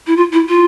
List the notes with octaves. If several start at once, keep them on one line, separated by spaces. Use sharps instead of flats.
E4
F4
E4
F4